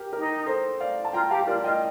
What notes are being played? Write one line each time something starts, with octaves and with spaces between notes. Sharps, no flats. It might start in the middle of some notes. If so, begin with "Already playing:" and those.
Already playing: G4 A#4
G4 A#4
D#4
A4 C5
D5 F5
A5
F4 G5 A#5
G4 F5 A5
F4 A#4 D5
F4 D#5 G5